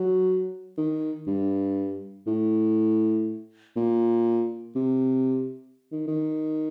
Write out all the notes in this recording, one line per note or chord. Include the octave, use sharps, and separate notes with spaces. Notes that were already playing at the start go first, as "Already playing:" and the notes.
Already playing: F#3
D#3
G2
A2
A#2
C3
D#3
D#3